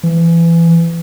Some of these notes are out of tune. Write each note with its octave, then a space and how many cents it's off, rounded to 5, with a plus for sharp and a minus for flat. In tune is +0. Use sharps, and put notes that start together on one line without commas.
E3 +25